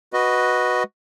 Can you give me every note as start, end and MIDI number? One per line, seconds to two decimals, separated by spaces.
0.13 0.83 66
0.13 0.83 71
0.13 0.83 75